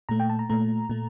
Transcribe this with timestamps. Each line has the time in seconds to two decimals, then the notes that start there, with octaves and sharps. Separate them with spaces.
0.09 A#2 A3 A#5
0.20 G5
0.30 A5
0.39 A#5
0.50 A#2 A3 A#5
0.90 A#2 A3